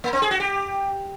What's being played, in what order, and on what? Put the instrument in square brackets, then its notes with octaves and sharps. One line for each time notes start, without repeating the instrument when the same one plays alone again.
[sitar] A#3
C4
G#4
F#4
G4